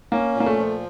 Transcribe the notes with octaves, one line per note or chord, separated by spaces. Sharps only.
A#3 C#4
A#2
A#3
A3
F3